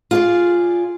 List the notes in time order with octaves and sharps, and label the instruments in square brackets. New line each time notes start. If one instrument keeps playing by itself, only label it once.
[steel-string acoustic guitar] F4 G#4 D5